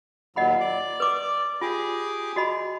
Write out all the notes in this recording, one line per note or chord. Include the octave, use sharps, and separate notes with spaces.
D#2 A#2 F#3 D#5 F#5 B5
D5
B4 D6
F4 G4 G#4 D6
F#4 D#5 B5